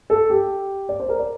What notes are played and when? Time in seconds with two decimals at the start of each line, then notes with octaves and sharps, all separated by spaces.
0.10 A4
0.30 G4
0.89 D5
1.00 C5
1.09 A#4
1.19 D5